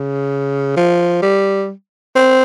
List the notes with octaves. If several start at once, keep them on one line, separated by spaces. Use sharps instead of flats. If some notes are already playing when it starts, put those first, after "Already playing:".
Already playing: C#3
F3
G3
C4